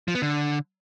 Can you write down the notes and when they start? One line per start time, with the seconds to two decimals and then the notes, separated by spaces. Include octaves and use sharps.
0.08 F3
0.15 B3
0.22 D3